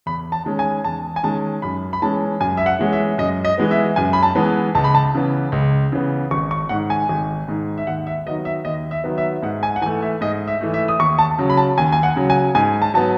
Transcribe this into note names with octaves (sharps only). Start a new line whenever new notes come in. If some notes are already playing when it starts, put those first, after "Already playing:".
E2 B5
A5
D#3 G#3 C#4
G#5
E2 A5
G#5
D#3 G#3 C#4 A5
F#2 B5
B5
E3 G#3 C#4 A5
F#2 G#5
E5
F#5
E3 G#3 C#4
E5
F#2 D#5
D#5
E3 G#3 B3
E5
F#2 G#5
B5
A5
E3 G#3 B3
C#2 A5
B5
A5
C#3 E3 B3
C#2
C#3 E3 B3
G#1 C#6
C#6
G#2 D#3 F#5
G#5
G#1
G#2 D#3
E5
D#2 F#5
E5
D#3 F#3 B3 D#5
E5
D#2 D#5
E5
D#3 F#3 B3
E5
G#2 F#5
G#5
F#5
E3 A3 G#5
E5
G#2 D#5
E5
E3 A3
E5
D#6
D#2 C#6
A5
C#3 F#3
B5
A5
D#2 G#5
G#5
F#5
C#3 F#3
G#5
G#2 G#5
A5
F#3 B3 A5